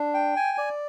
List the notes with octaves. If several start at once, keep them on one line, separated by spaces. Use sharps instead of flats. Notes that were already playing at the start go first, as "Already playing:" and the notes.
Already playing: D4
G5
G#5
D5